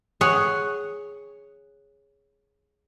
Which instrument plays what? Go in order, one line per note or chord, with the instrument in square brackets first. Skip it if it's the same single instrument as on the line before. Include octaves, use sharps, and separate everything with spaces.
[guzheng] G#4 C#5 F#5